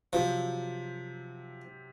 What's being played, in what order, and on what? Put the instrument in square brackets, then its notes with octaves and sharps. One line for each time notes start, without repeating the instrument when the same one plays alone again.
[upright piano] C3 F#3 C4 [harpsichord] F3